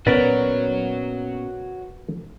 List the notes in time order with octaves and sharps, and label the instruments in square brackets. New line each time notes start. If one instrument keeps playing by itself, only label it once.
[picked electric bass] A#2 B3 C#4 [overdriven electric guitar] F#4 C#5 [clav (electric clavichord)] A#4 B4 D5